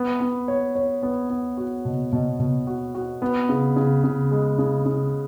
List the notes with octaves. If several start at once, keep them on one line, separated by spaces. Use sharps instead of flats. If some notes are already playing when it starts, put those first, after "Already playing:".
Already playing: B3
B3
C#5
C#5
B3
B3
F#4
B2
B2
B2
F#4
F#4
B3
C#3
C#3
C#3
G#3
C#3
C#3